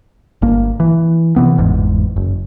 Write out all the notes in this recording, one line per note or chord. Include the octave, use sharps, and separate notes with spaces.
G1 A#3
E3
C3 E3 B3
G1 E2 G#2
F#1